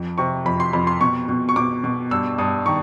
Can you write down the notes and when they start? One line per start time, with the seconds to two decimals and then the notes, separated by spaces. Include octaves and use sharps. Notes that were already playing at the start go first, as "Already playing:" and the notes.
Already playing: F2
0.18 C3 C#6
0.46 F2 B5
0.60 C6
0.73 F2 B5
0.87 C6
1.01 B2 C#6
1.29 B2
1.49 C#6
1.56 B2 D6
1.84 B2
2.11 G2 E6
2.38 G2 D#6
2.66 D#3 C#6